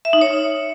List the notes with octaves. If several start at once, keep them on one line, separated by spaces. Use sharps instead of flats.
E5
D#4
C#5